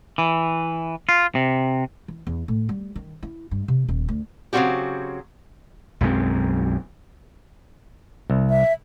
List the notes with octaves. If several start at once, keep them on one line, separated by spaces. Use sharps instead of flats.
E3
F4
C3
E3
E2
A2
G3
D#3
E4
G2
C3
D#1
D2
C#3 F#3 A#3 C4 F#4 G4
B1 F#2 G#3 C4
C2
E5